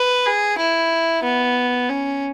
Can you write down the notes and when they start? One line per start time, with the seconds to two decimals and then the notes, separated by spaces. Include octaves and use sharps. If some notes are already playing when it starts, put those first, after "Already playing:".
Already playing: B4
0.26 G#4
0.58 E4
1.23 B3
1.89 C#4